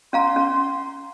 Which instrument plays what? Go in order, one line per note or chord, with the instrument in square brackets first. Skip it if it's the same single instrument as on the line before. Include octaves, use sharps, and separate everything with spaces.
[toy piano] C#4 F5 A#5 [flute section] C6
[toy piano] C#4